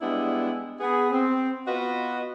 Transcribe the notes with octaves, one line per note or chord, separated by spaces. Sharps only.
G3 G#3 B3 D4 E4
B3 G#4
C4
B3 F4 F#4 B4 D#5